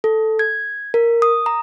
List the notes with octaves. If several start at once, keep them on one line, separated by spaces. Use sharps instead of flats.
A4
G#6
A#4
D#6
A#5